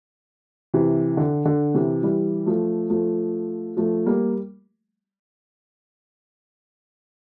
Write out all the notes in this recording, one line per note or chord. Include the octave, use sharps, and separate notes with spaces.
C3 E3
D3
D3
C3 E3
E3 G3
F3 A3
F3 A3
F3 A3
G3 A#3